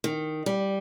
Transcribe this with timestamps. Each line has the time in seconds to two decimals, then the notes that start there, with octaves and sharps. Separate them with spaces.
0.04 D#3
0.46 G3